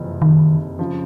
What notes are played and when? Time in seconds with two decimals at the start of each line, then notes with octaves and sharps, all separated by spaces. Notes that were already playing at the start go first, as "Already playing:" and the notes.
Already playing: F#1 F2 C3 E3 G3
0.22 D#3
0.79 C#3 F3